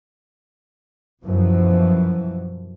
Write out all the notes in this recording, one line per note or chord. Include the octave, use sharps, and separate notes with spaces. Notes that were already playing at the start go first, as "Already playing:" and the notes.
F#2 B2 E3 F3